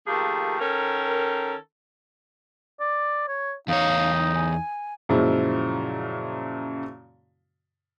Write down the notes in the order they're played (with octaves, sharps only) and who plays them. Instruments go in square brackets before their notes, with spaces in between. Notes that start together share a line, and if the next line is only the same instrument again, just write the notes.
[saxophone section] D#3 F3 A3 A#3 G4 G#4
D#3 C#4 A4 A#4
[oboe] D5
C#5
[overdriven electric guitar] E2 C#5 [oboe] D#4 [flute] F5
[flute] G#5
[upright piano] F#2 A#2 C#3 F3 G#3 E4